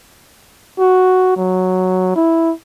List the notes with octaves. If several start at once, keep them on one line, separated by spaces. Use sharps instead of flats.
F#4
F#3
E4